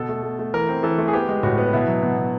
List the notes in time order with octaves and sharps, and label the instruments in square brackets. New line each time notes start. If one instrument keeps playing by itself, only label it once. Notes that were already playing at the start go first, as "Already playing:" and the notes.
Already playing: [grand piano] B2 A4
A3
A3
A3
E3 A#4
C4
E3 A4
A3
G#4
B3 G4
G#3
A2 F#4
B3
B2 E4
F#3
B2
B2